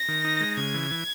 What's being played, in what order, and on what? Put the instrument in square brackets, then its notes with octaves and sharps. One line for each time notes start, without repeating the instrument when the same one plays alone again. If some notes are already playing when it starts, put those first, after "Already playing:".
Already playing: [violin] A#6
[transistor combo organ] D#3
D#4
G#3
[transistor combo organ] C#3 [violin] G#6
[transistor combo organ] E3
E3